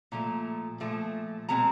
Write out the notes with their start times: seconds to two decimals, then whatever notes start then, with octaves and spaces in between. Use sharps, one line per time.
0.12 A#2 F3 A3 A#5
0.80 A#2 F3 A3
1.49 B2 G#3 C4 A#5